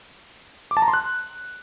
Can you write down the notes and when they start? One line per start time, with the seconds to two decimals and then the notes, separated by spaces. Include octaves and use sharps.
0.71 D6
0.77 A5
0.82 A#5
0.88 C6
0.94 F#6